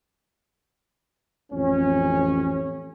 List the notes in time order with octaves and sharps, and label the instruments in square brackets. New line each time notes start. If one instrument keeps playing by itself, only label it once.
[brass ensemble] A1 F2 C#4